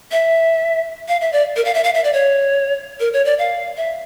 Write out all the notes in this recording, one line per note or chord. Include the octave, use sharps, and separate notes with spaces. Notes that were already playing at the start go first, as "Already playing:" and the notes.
E5
F5
E5
D5
A#4
F5
E5
F5
E5
D5
C#5
A#4
C#5
D5
F5
E5